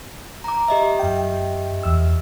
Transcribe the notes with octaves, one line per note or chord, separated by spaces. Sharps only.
A#5 D6
G4 D#5 E5
F#2 G5
E2 E6